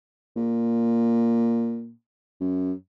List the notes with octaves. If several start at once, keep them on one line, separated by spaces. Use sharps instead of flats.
A#2
F#2